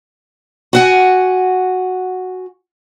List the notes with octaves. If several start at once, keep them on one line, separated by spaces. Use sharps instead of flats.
F#4 F#5 G#5